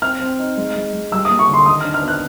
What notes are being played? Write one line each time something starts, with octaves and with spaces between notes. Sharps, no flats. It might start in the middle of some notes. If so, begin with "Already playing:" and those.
C4 F6
C4
D#4
G#3
G#3
G#3
G3 E6
D#6
A#3
C#6
D3
C6
D#3 D#6
F6
D4
F6
B3
F#6